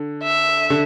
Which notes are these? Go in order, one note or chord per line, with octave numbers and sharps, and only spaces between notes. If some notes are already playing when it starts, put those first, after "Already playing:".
Already playing: D3
E5
D3